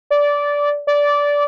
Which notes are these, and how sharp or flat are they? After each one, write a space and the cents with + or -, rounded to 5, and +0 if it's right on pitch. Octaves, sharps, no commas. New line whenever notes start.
D5 -15
D5 -15